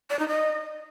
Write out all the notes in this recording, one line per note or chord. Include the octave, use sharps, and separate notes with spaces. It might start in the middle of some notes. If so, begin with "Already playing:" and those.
D5
D#4
D#5